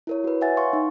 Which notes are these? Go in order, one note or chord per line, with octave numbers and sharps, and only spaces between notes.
E4 A#4 C#5
F#4 B4
C#5 E5 F#5 G#5 A6
F5 C6 C#6
D#4